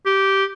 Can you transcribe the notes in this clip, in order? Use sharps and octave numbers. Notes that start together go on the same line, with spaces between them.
G4